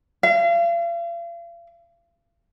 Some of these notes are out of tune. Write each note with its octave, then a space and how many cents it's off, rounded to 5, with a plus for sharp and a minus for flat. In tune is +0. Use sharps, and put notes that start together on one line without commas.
F5 -40